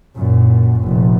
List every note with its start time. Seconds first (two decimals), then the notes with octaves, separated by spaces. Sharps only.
0.16 F#2 A#2
0.80 F1 A#2